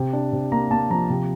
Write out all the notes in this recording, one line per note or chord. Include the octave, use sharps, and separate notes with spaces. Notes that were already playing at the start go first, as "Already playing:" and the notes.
Already playing: C3
D4
C3
A#3 A#5
A#3 A5
F3 A#5
C3